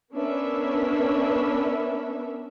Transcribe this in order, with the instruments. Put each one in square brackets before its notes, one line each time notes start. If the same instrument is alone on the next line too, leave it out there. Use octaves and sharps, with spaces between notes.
[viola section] B3 C#4 D4 A#4 B4 E5